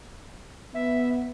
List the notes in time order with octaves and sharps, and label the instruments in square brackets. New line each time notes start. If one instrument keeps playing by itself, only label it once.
[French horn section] B3 [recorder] E5